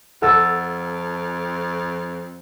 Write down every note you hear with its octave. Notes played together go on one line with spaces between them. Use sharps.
F2 A4 F#5 E6 A6